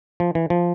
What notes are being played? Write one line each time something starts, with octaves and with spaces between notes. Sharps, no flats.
F3
E3
F3